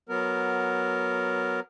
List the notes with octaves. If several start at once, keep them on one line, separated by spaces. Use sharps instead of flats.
F#3 B3 A#4